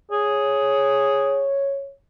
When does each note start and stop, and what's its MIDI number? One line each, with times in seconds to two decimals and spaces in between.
0.11 1.49 68
0.11 1.93 73